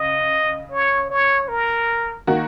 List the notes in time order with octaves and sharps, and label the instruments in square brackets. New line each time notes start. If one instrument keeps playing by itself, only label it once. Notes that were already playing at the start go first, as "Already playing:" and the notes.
Already playing: [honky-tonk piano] C#3 [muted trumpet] D#5
[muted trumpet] C#5
C#5
A#4
[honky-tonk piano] D#3 A#3 F#4